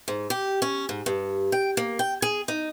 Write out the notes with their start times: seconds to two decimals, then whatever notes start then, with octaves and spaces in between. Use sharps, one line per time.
0.08 G#2
0.30 G4
0.62 C#4
0.89 G#2
1.06 G2
1.52 G5
1.77 A#3
1.99 G5
2.22 G#4
2.48 D#4